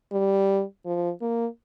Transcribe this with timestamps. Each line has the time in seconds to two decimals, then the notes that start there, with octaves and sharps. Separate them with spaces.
0.12 G3
0.86 F3
1.21 A#3